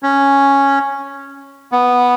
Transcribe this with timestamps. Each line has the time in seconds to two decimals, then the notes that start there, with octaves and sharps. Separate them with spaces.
0.03 C#4
1.72 B3